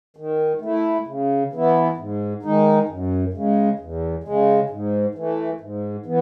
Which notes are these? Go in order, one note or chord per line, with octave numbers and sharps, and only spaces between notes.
D#3
A3 E4
C#3
E3 B3 E4
G#2
D#3 G#3 D#4
F#2
C#3 G#3
E2
C#3 G#3
G#2
E3 A3
G#2
E3 B3